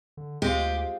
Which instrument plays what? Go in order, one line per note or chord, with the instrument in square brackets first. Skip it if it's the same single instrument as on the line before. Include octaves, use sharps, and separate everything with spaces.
[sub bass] D3
[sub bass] D2 [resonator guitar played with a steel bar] G#3 C4 F4 [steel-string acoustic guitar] G4